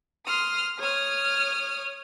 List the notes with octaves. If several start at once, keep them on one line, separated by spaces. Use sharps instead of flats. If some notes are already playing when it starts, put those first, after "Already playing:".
C6 D#6 F6
C#5 D#6 F6